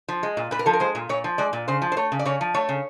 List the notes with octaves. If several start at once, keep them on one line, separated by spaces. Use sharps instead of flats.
F3
G#3
A#2
A#2 B4
A#4
F3 A4
A#4
G#3 C5
A#2
A#2 C#5
F3
G#3 D5
A#2
C#3 C5
F3
C5
A3 C#5
C#3
D5
C#3 C#5
F3
A3 C#5
C#3